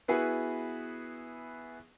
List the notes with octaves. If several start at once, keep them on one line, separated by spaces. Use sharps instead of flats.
B3 E4 F#4 G#4 B4